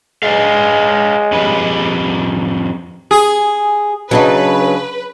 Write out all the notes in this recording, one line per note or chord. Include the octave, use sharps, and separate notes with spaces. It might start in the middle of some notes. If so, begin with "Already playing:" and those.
G#3 B4 D5 F5
F2 G3 B4
G#4
C#3 F#3 D4 D#4 B4